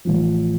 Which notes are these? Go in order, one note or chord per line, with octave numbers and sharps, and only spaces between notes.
A1 A2 F3